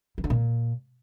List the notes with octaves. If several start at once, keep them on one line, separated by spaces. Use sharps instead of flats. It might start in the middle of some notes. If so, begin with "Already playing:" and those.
E3
D3
A#2